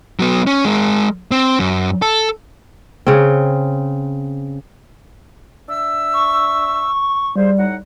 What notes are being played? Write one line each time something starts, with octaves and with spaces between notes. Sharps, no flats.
F#3 B3
C#4
G#3 A#4
C4
F#2
A4
C#3 C4
D4 E5 E6
C#6
G3 F4 G#4 C5
A2 D#4 F#5